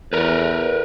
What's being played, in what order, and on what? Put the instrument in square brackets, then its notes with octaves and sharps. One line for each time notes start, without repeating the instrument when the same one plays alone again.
[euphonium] E2 [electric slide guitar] A#4 B4